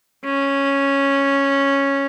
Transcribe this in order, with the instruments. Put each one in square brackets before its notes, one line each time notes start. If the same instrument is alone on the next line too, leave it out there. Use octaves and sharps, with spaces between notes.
[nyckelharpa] C#4